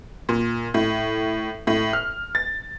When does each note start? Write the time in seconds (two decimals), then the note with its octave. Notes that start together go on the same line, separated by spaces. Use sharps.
0.29 A#2
0.74 A2
1.67 A2
1.93 F6
2.35 A6